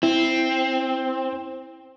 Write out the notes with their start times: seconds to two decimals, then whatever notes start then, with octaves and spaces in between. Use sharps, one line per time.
0.03 C4 E4